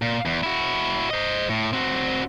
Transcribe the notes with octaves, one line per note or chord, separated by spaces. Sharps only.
A#2
E2
E4 F#4
C5 D#5
A2
C4 F#4